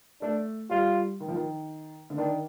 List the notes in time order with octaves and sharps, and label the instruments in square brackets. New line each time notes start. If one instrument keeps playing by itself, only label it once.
[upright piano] A3 [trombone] D4
[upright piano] G3 [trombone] F4
[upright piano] D#3
F3
D#3
D3
[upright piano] D#3 [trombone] D4